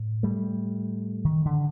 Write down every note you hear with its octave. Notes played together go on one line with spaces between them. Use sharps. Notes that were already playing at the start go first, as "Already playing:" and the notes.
Already playing: A2
G3 A3
D#3
D3